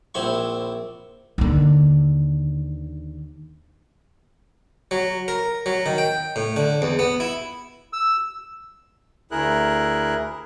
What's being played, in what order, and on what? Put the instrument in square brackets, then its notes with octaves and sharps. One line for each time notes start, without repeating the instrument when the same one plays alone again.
[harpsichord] A#1 C4 E4 C#6
[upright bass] D#2 D3
[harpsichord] F#3
A#4
F#3
D#3
G5
A2
D3
E2
B3
E4
[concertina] E6
[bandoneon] D2 E4 G#4 A#4 F#6